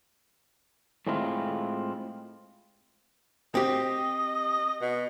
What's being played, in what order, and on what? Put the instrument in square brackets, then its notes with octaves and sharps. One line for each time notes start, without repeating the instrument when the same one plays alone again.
[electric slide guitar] A2 G#3 C4 E4 F4
[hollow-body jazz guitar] C4 G4 [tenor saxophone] D#5
[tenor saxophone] B2